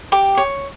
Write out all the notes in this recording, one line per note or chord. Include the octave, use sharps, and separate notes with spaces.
G4 D6
C#5